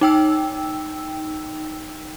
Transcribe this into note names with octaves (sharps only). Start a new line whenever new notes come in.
D#4 G5 E6